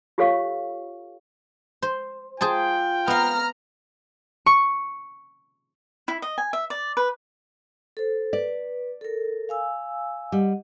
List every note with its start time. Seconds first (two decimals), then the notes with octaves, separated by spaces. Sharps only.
0.18 F4 G4 A4 C#5 F5 C#6
1.82 C5
2.41 F4 G#4 C5 G5 A5
3.08 B3 F5 A#5 F6
4.46 C#6
6.08 E4
6.22 D#5
6.38 G#5
6.53 E5
6.70 D5
6.97 B4
7.97 A4 C5
8.33 B4 D5
9.01 A4 A#4
9.49 F5 G#5 E6
10.32 G3 D#5 F#5